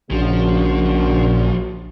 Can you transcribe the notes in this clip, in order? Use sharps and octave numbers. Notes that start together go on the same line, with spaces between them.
A#1 C#3 F3 A#3 D4 F#4